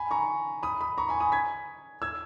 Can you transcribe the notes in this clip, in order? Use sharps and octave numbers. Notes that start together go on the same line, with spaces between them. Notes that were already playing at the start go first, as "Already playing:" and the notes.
Already playing: G#5 B5
A#5 C#6
B5 D#6
B5 D#6
A#5 C#6
G#5 B5
B5 D#6
G#6 B6
E6 G#6